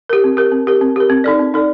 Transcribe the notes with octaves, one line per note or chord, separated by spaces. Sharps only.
G4 A#4
C4
G4 A#4
C4
G4 A#4
C4
G4 A#4
C4
D#4 A4 D5
C4
D#4 A4 D5